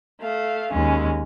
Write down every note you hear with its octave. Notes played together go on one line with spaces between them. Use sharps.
A3 F5
D#2 G#3 C#4